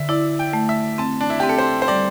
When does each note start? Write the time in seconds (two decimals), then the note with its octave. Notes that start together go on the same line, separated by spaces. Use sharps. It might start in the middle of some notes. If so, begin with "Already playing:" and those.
Already playing: D3 E5
0.09 E4 D5
0.39 G5
0.53 A3
0.69 E5
0.98 C4 A5
1.21 D4
1.30 E4
1.40 C4 G4
1.49 A4
1.58 C5
1.82 C5
1.88 G3 D5